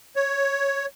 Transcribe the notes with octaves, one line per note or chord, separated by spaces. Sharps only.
C#5